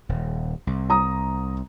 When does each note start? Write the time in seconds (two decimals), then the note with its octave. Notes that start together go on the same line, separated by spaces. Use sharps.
0.09 D#1
0.67 C2
0.90 A#5 D#6